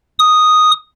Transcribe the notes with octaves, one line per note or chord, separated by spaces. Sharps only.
D#6